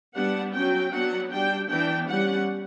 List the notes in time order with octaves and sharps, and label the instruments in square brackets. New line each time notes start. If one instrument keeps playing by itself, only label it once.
[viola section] G3 B3 D4 F#5
F#3 C#4 G5
F#3 B3 D4 F#5
G3 D4 G5
E3 B3 D4 G5
G3 C#4 F#5